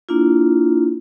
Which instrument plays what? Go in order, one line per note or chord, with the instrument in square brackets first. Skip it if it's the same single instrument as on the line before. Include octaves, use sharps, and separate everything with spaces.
[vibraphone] A#3 D4 E4 F4